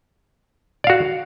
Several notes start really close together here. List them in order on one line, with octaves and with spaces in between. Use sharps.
D5 F5 F#4